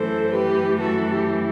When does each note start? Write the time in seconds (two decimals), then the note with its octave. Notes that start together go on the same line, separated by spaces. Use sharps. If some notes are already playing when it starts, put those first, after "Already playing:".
Already playing: F#2 E3 A3 A4 C5
0.33 G4 B4
0.80 F#4 A4
1.12 G4